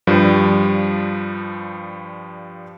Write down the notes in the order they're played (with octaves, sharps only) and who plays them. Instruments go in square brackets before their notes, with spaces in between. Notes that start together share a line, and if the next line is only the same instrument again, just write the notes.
[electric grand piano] G2 F3 G3